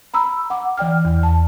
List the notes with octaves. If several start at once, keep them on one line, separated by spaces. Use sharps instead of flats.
A#5 B5 E6
F#5 D6
E3 D5 G5 F6
E2
A5